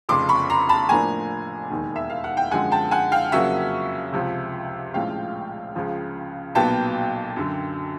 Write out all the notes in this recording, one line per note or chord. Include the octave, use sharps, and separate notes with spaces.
F1 F2 C#3 C6 D6
B5 C#6
A#5 C6
A5 B5
A2 F3 A#3 D4 G#5 A#5
E1 D#2 D#3
E5
F5
F#5
G5
F#2 D3 F3 G#3 C4 F#5 G#5
G5 A5
F#5 G#5
F5 G5
F2 C#3 F#3 A#3 C#4 E5 F#5
C#2 C3 F3
A#1 A2 F3 G#3 C#4 F5 G5
C#2 C#3 F3
B1 A#2 F#3 B3 G5 A5
F#2 D3 F#3